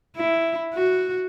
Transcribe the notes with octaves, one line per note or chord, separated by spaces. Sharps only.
E4
F#4